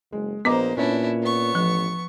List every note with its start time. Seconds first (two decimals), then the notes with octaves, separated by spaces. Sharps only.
0.12 F#1 G#3
0.45 A#1 A#3 B3 B4 C5 D#5 A#5 D6
0.77 A#2 C#4 D4 E4 B4 C#5
1.22 B3 C#6
1.55 A1 F3